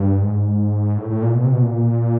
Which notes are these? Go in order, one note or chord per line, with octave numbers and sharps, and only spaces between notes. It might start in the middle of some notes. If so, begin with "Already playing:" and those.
Already playing: G2
G#2
A2
A2
A#2
B2
C3
B2
A#2